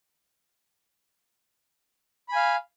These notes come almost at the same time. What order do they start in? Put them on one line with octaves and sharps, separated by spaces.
B5 G#5 F5